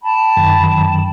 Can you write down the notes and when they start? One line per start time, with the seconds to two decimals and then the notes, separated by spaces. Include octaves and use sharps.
0.02 G5 A5 B5
0.37 F#2 D#3 F#3